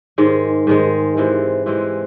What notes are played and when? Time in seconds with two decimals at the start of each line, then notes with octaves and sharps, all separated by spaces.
0.18 G#2 D#3 G#3
0.67 G#2 D#3 G#3
1.17 C3 E3 G#3 C4
1.66 C3 E3 G#3 C4